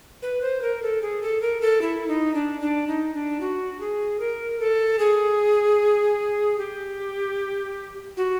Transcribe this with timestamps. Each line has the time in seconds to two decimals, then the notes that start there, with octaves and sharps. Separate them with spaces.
0.22 B4
0.42 C5
0.62 A#4
0.82 A4
1.02 G#4
1.22 A4
1.42 A#4
1.61 A4
1.82 E4
2.08 D#4
2.34 D4
2.61 D4
2.87 D#4
3.14 D4
3.41 F#4
3.80 G#4
4.20 A#4
4.60 A4
4.99 G#4
6.59 G4
8.17 F#4